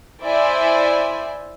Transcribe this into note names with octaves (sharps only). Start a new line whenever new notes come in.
E4 C5 D5 E5 G#5